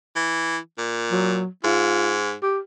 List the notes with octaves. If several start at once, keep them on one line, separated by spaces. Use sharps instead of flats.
E3
A#2
F#3
G#2 F4
G4